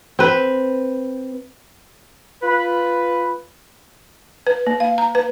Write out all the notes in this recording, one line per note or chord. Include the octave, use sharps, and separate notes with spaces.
C4 B4
F4 B4
B4
A#3
F5
A#5
B4